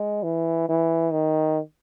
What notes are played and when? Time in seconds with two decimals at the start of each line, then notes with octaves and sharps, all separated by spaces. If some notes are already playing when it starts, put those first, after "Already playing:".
Already playing: G#3
0.23 E3
0.69 E3
1.12 D#3